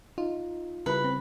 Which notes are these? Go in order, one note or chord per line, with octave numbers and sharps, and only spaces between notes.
D#4 F4
C#3 G3 E4 B4
C4